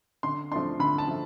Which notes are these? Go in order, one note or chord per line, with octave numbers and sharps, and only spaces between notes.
D3 C6
F3 A3 D4 C6
D3 B5
A5
F3 A3